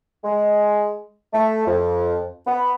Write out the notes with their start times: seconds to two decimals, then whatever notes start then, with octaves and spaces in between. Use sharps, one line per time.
0.24 G#3
1.33 A3
1.66 F2
2.47 B3